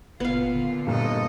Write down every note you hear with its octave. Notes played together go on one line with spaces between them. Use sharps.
F#1 A#2 B3 F4 F5
D3
G2 A#2 A4 D#5